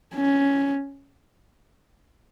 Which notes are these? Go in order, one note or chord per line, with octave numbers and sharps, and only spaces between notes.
C#4